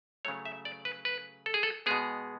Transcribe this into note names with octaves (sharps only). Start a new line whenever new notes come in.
C#3 F#3 A3 C#5
E5
D5
B4
B4
A4
G#4
A4
B2 G#3 B3 G#4